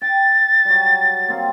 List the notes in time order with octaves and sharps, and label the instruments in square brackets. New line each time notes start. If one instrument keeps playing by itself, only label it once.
[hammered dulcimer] G5 [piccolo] A6
[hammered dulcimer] F#3 G3
A#3 C4 F5